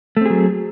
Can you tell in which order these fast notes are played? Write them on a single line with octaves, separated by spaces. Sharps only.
A3 C4 G#4 F#3